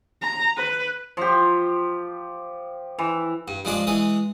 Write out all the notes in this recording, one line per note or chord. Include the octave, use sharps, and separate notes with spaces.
A#5
B4
F3 G4
E3
G2
G2 F3 G#3 D4 A5
E3 G#3 D#6